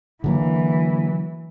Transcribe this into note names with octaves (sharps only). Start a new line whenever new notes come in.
D3 E3 F#3 A#3